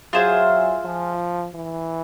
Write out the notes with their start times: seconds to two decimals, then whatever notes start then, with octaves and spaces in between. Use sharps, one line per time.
0.13 F#3 F4 G#4 C5 E5
0.85 F3
1.55 E3